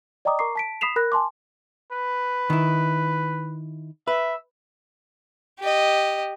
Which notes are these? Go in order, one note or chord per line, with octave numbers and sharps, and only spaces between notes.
D5 D#5 G5 A#5 D6 D#6
A#4 A#5 C#6 D6 C7
A5 B6 D7
B5 D#6 B6 C7 E7 F7
A#4 B5 F#6 A#6
G#5 A5 C6 D6
B4
D#3 E4
B4 E5
G4 D#5